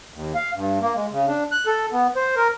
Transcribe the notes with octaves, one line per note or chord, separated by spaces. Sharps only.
D#2
F5
G2
A#3
G#3
C#3
D4
F#6
A4
B3
C5
A#4